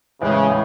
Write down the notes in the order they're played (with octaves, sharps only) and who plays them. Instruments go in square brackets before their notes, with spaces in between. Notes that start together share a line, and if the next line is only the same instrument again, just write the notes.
[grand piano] A2 E3 G#3 [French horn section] C#3
[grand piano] A2